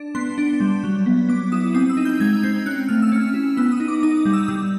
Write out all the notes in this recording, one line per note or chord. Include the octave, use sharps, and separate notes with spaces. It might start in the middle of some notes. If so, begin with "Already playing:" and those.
Already playing: D4
B3 C6
D4
G3
F#3
B3
B3 D6
E4 D#6
C4 D#6
E6
D#4
G6
G#3 G#6
C4 G6
C#4 F#6
A3 F6
E6
C#4 F6
E4
B3 E6
D#6
D#4
D6
D#4 D#6
G3
E6
G3 E6